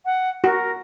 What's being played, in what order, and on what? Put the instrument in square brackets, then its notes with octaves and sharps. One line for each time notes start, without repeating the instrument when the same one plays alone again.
[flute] F#5
[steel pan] F#4 [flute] A#4